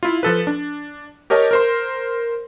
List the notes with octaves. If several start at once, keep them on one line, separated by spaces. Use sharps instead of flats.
E4 F4
F3 A4 B4
D4
G4 A#4 C#5 D#5 A5
A#4 C5 C6